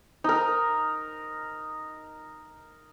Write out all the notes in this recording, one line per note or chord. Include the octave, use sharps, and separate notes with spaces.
D#4 A#4